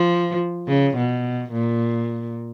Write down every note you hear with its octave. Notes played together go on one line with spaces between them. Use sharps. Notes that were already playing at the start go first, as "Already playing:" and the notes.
Already playing: F3
C#3
B2
A#2